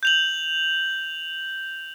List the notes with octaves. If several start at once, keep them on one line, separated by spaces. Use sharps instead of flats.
G6 F7 F#7